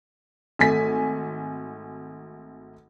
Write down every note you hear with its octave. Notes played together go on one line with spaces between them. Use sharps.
G#1 A3 G#5 B6